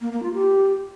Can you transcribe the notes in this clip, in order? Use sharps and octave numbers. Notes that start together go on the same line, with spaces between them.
A#3
A#3
F4
G4